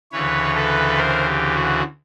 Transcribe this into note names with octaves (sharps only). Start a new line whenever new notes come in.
D2 C#3 E3 B4 C#5
A4 B4
A#4 C5
G4
F#4